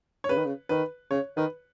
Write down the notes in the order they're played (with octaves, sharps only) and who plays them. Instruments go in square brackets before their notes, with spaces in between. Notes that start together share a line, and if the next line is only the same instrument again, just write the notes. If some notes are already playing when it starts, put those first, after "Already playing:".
[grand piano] C#5
[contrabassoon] C#3 [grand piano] B4
[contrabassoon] D#3
C#3
[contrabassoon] D#3 [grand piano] B4
[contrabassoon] C#3 [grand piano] C#5
[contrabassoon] D#3 [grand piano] B4